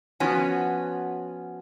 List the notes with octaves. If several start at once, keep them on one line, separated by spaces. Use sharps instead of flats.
F3 B3 C#4 F#4